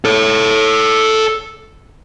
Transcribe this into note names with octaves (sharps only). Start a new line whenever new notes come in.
A4 C#5